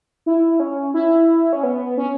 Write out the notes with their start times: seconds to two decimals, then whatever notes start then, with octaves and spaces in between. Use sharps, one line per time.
0.26 E4
0.60 C#4
0.94 E4
1.53 C#4
1.63 B3
1.97 C#4